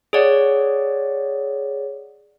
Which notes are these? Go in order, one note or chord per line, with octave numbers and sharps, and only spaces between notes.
G#4 C#5 D5 F#5